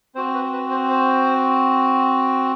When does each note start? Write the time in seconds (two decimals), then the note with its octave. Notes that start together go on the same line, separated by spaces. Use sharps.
0.15 C4 C5
0.18 F#4
0.34 B4
0.53 B4
0.71 C5
0.90 C5